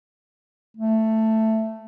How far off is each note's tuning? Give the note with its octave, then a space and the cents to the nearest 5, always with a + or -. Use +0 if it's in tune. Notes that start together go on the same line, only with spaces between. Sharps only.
A3 +5